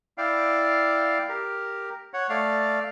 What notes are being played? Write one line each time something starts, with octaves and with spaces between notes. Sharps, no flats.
E4 D5 F5 G5
G4 A#4
C#5 F#5
A3 D5 F5 F6